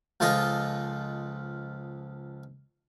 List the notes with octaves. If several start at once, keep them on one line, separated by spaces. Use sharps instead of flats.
C#2 F3 F4 A4 D#5